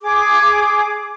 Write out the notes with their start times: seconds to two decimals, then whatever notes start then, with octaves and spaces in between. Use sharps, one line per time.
0.02 G#4 D6